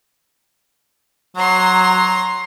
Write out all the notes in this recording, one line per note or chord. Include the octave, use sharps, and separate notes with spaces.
F#3 A#5 C6